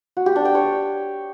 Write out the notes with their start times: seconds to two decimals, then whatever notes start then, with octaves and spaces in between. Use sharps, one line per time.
0.17 F#4
0.26 G4
0.36 D4
0.45 G5
0.55 C#5